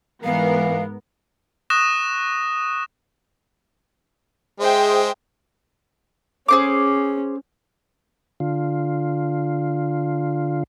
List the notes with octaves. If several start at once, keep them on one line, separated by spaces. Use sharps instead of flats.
G#2 E3 B3 A#4 F5
C#6 D#6 F#6 A#6 E7
G#3 G#4 C5 E5 G5
C#4 G#4 C5 D6
D3 F4